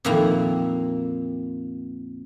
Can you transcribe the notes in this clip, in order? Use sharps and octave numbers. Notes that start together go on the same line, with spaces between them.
F2 A#2 D#3 A#3 E4 A#5